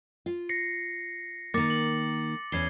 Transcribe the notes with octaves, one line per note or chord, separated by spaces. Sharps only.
F4
A#6 C7 C#7
D#3 A#3 D6 A6 C#7
F#7
E2 C#4 G#6 C7 G7